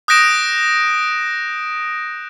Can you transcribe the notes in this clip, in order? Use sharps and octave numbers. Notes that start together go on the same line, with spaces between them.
D#6 F#6 G6 A#6 D7 E7